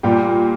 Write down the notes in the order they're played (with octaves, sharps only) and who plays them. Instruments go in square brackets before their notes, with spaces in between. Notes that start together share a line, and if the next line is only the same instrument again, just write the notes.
[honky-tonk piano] A#2 [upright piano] G3 G4